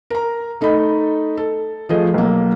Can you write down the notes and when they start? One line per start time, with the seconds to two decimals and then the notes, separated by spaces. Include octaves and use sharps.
0.10 A#4 A#5
0.61 A3 D#4 A4 D#5 B5
1.37 A4
1.89 F3 A3 G#4 D#5
2.14 B1 A#3